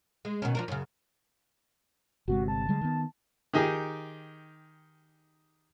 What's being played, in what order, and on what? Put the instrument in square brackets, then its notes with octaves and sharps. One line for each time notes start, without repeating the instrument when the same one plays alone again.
[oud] G#3
B2 D#3 C#4
F3 D4 A#4
F#2 C#3
[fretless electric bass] G1 C3 G#3 [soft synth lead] F#4
[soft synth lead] A5
[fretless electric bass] D3 G3 G#3
D#3 B3
[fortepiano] D#3 D#4 G4 G#4